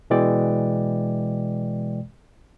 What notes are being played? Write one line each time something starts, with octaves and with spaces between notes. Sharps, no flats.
B2 E3 G#3 D5 G5